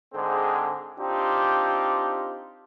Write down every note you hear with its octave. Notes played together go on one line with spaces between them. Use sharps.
G#2 D3 G#3 C4 G#4
C4 D4 D#4 F4 G4